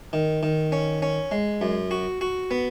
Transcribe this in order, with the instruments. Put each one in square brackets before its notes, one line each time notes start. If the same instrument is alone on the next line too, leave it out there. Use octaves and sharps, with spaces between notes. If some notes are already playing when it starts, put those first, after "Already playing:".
[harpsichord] D#3
D#3
C#4
C#4
G#3
F#2
F#4
F#4
B3